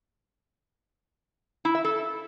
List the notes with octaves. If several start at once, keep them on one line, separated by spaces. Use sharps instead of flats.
E4
E5
A4